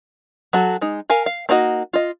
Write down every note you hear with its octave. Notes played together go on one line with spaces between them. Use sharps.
F#3 F#4 A4
G#3 D#4
A#4 F5 G#5
F5
A#3 D4 D#4 F#4 D#5
F4 D#5